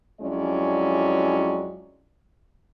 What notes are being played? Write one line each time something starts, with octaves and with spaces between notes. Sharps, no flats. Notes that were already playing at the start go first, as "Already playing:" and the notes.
F2 F#3 G#3 C#4 E4 D5